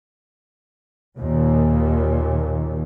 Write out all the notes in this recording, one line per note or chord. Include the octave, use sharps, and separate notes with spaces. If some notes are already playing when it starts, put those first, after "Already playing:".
D#2 A#2